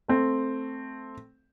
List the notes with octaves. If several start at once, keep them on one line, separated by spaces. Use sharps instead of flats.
A3 C4